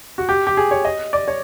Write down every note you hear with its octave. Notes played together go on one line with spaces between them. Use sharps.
F#4
G4
G4
G#4
C#5
D#5
D5
C#5